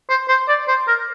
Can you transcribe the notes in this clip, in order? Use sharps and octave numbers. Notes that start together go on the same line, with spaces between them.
C5
C5
D5
C5
A#4